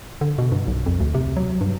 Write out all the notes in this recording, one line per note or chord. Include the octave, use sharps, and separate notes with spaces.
D3
B2
G2
B1
F2
D2
C3
F#3
G2